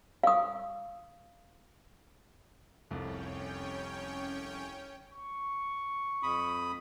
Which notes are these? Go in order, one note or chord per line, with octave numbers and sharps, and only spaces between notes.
F5 D#6
F1 C2 F2 C#4 C#5 G5
C#6
F2 B5 D#6